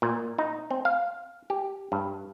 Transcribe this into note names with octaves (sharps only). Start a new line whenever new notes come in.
A#2
D#4
C4
F5
G4
G2